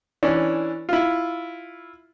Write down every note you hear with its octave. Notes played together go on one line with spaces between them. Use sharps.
E3 C#4 D4
E4 F4